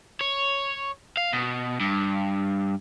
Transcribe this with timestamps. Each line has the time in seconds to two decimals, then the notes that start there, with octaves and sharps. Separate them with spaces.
0.21 C#5
1.17 F5
1.33 B2
1.80 G2